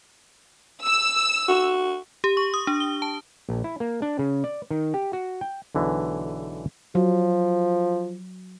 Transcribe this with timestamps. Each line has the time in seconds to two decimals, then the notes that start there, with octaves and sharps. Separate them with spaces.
0.84 E6
1.49 F#4
2.24 G4
2.37 C#6
2.54 D#6
2.67 D4
2.80 G7
3.02 A5
3.49 A#1
3.64 E4
3.80 A#3
4.02 D4
4.19 C#3
4.44 D5
4.71 D#3
4.94 G4
5.13 F#4
5.41 G5
5.75 B1 D3 E3 G#3
6.95 F3 F#3